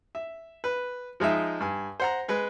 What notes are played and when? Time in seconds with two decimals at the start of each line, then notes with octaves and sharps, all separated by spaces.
0.15 E5
0.64 B4
1.20 F3 G#3 D#4 E5
1.60 G2 G#5
2.00 C5 F#5 A#5
2.28 G#3 B4 G#5